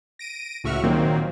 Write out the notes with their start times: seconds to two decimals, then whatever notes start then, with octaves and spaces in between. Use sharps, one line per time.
0.19 A#6 D7 D#7
0.64 C#2 A2 F#4 E5 C#6 F6
0.84 A#2 D#3 F#3 A#3 C4